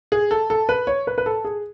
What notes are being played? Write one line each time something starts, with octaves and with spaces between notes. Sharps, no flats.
G#4
A4
A4
B4
C#5
B4
B4
A4
G#4